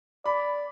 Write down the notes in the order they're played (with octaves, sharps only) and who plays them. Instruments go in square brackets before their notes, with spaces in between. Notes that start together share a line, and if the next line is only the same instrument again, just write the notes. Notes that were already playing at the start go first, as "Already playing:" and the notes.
[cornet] D5 [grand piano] B5